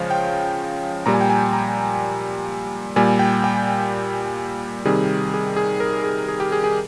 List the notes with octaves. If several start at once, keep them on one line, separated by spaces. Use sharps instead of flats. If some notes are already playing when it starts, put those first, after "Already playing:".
Already playing: C#3 F3 G#3 C5 C#5 F5
G5
A#2 G3 A#5
G#5
G5
G#5
A#5
A#2 G3 G#5
G5
G5
C3 D#3 G3 G#4
G#4
G#4
A#4
G#4
G#4
G4
G#4
G#4